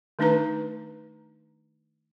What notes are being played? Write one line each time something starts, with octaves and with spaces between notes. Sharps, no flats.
D#3 A3 D4 D#4 B4 A#5